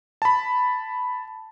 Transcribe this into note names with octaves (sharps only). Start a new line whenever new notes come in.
A5 B5